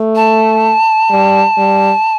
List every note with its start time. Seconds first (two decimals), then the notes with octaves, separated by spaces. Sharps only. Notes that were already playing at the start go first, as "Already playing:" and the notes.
Already playing: A3
0.16 A5
1.11 G3
1.58 G3